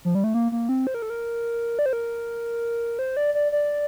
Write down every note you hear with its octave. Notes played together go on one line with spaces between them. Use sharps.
F3
G3
A3
A#3
A#3
C4
C5
A#4
A4
A#4
D5
C5
A#4
C5
D5
D5
D5